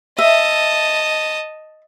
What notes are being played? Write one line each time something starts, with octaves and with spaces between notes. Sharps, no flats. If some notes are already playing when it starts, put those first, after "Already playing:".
D#5 E5 A5